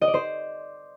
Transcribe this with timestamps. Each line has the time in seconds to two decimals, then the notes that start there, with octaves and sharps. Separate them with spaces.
0.01 D#5
0.08 D5
0.14 C5